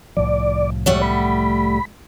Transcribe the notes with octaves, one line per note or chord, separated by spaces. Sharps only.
C2 A2 F3 D5
G3 A3 C#5 F#5
B5